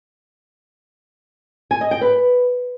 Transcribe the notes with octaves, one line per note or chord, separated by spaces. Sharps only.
G#5
D#5
G5
B4